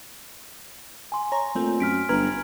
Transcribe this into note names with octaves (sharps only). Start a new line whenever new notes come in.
G#5 C6
C#5 A#5
A#2 A3 C4
F#2 F6 B6 D7
G1 B4 A#5 F6 G#6